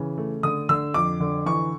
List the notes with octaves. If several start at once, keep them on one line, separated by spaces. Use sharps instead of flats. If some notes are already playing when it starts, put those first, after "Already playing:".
Already playing: C#3 E3
A3
D3 D#6
D3 E6
F2 D6
D3
E3 C#6